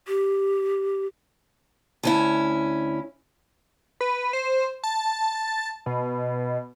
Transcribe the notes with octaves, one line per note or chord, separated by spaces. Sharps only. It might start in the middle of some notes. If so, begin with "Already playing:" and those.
G4
D2 C#4 E4
B4
C5
A5
B2